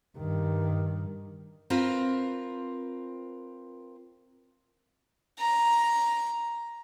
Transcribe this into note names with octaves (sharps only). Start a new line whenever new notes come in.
G2 D#3
C4 F4 A#4 B4
A#5